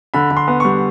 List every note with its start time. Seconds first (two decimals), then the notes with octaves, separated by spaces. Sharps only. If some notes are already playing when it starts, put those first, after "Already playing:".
0.14 D3 B5
0.31 D3
0.37 C6
0.48 B3
0.60 G3 C#6